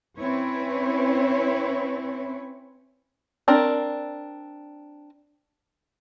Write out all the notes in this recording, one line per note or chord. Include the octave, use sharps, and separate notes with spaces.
C4 C#4 E4 B4 C#5
C4 D4 A#4